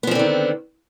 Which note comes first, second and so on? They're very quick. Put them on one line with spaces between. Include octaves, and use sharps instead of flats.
B3 F3 C4 D3 D#3